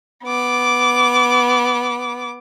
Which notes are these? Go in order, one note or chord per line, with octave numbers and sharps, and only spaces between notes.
B3 D6